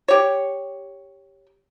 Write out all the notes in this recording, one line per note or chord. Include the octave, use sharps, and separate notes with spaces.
G4 C#5